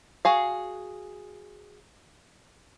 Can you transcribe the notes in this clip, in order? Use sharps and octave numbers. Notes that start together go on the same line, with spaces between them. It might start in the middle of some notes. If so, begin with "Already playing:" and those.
F#4 G#4 F5